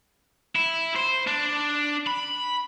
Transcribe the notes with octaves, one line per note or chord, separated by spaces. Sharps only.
E4
C5
D4
B5